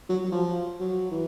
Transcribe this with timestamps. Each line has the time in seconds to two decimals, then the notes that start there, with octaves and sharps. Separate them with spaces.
0.09 F#3
0.24 F#3
0.32 F3
0.80 F#3
1.11 E3